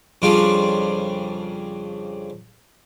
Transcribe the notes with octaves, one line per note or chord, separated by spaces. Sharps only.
F2 C#3 G3 D4 F4